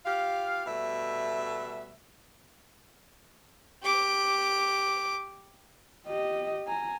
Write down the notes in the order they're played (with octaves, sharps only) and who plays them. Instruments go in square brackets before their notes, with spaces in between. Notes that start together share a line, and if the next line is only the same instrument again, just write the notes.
[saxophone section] F4 G4 F5
B2 G3 A3 E5
[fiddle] G4 D6
[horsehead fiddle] G4 D#5
G#5 A#5